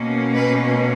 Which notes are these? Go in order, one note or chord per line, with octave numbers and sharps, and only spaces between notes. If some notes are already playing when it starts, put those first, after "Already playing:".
Already playing: B2 A#3 C#4
B4